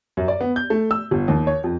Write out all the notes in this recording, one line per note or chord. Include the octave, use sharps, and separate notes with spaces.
F#2
D5
B3
G6
A3
E6
G1
D#2
C#5
F2